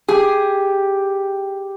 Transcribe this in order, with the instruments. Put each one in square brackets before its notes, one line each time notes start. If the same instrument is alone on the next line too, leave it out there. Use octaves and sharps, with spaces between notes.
[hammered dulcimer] G4 [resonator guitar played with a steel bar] G#4